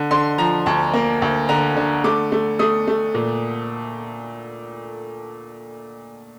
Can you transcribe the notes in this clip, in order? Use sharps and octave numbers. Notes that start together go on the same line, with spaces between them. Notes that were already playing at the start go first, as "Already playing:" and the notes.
Already playing: D3
D3 C6
F3 A#5
D2 A5
A#3
D2
D3 A#5
D3
A3 D6
A3
A3 D#6
A3
A#2